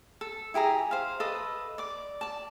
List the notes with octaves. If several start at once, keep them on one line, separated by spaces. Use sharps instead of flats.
A4
E4 G4 G#4 A#5
C5 F5
A4 B4 D#5 D6
D5 D6
D5 A5